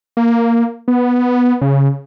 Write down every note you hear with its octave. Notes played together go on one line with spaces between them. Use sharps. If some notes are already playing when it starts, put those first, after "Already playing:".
A#3
B3
C#3